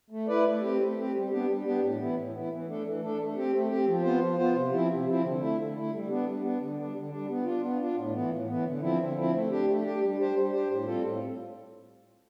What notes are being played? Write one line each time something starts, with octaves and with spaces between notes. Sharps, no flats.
A3
E4 B4 D5
A3
C4 G4
A3
C4 G4
G3
B3 D4 G4
G3
B3 D4 G4
A2
E3 B3 E4
A2
E3 B3 E4
E3
A3 D4 A4
E3
A3 D4 A4
A3
C4 G4
A3
C4 G4
F3
B3 F4 C5
F3
B3 F4 C5
C3
F3 C4 E4
C3
F3 C4 E4
D3
A3 E4
D3
A3 E4
G3
B3 D4
G3
B3 D4
D3
G3 D4
D3
G3 D4
B3
D4 F4
B3
D4 F4
A2
E3 B3
A2
E3 B3
D3
F3 C4 E4
D3
F3 C4 E4
A3
D4 G4
A3
D4 G4
G3
D4 G4 C5
G3
D4 G4 C5
A2
G3 C4 F4 A4
A2